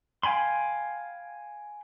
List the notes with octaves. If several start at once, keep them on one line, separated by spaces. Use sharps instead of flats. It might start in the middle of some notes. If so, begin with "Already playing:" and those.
F5 G5 G#5 B5 C6